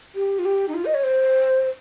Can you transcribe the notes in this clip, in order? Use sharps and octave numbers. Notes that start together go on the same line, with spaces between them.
G4
F4
G4
D#4
F4
D#5
C#5
C5